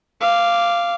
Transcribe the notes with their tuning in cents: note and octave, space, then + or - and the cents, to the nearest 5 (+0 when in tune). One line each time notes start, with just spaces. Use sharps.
F5 -10 D6 +0